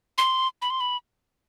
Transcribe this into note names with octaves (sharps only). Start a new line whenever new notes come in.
C6
B5
C6
B5